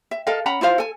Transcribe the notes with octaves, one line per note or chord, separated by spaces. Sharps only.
E5
A4 A#4 D#5 F5
C#4 F#5 A#5 B5
E4 F4 C5 F5
A4 G#5